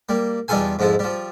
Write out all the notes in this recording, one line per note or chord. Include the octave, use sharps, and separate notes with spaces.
G3 A#3
E2 G3 D#4 F4 A4 G#5
F2 G#2 F3 E4
F3 G3